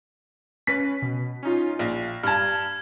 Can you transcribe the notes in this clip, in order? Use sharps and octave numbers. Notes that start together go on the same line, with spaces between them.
C#4 B4 B6
B2
C#4 D#4 F4
A#1 F5
G2 A5 F6 G#6